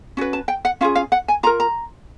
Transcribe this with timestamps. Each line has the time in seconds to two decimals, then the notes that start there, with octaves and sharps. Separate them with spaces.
0.17 C#4 F#4 B4
0.33 A5
0.48 G5
0.65 F#5
0.81 C#4 F4 G#4 F5
0.95 F5
1.12 F#5
1.28 G#5
1.43 F4 A#5
1.47 A#4
1.60 A#5